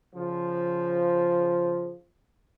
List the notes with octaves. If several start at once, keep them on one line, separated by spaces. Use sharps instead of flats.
C#3 F3